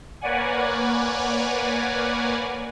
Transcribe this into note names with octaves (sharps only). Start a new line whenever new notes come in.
A#3 B4 C#5 D5 F#5 G#5